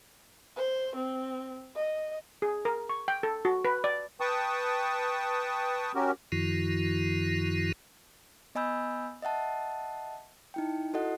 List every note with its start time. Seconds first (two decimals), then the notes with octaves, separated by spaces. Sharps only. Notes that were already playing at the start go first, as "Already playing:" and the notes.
0.56 C5
0.96 C4
1.75 D#5
2.42 G#4
2.65 A#4
2.89 C#6
3.08 G5
3.23 A4
3.45 F#4
3.65 B4
3.84 D5
4.20 B4 G5 A5 C#6 D#6
5.95 C#4 F#4 G4 A#4
6.32 F#2 D#3 F3 E4 F#4
8.55 B3 D#5 G#5 B5 E6 G6
9.23 D#5 E5 F#5 A5
10.54 D#4 E4 G5
10.93 E4 F#4 A4 D#5 F#5